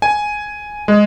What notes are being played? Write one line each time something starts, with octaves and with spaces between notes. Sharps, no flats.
G#5
G#3